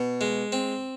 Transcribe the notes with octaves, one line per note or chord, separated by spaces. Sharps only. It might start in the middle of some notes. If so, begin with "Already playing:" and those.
Already playing: B2
G#3
C4